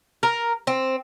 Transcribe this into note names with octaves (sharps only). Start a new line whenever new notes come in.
A#4
C4